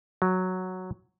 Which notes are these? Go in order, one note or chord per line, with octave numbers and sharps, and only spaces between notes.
F#3